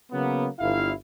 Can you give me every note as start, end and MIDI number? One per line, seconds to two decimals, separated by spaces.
0.12 0.47 49
0.12 0.47 54
0.12 0.47 58
0.12 0.47 59
0.59 0.92 31
0.59 0.92 64
0.59 0.92 77